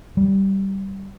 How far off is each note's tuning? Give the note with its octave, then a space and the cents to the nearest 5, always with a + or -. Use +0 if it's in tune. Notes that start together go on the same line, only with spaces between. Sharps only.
G3 -10